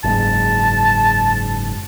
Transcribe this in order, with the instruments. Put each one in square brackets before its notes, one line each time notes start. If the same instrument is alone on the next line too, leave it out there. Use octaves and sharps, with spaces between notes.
[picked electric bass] F#1 G#2 [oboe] A5